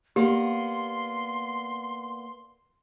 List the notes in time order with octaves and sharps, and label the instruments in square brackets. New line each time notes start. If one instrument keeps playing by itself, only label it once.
[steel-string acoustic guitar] A#3 B3 D5 [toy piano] G4 [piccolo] C6